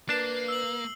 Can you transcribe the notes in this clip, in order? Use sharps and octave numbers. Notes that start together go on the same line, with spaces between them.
A#3 D4 B4 A5 C7
E6 C7 F#7